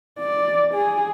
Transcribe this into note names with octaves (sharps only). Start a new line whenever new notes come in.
D5
G#4